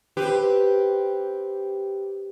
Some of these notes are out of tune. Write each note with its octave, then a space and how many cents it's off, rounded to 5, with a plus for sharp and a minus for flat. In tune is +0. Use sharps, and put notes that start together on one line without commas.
C4 +0 G4 +0 B4 +0